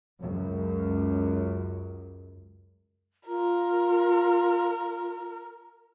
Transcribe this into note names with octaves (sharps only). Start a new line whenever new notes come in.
C#2 F#2
F4 A#4